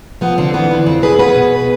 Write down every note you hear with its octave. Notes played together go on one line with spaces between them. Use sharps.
F3 B3
D3 C4
E3 B3
E3
F2 C4
F2 G#4 B4
B3 G#4 B4
B2